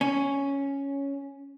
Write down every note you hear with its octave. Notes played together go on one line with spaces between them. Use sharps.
C#4